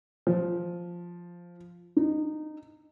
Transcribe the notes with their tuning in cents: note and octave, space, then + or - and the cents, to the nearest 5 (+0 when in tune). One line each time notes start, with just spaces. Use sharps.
F3 +0
D#4 -20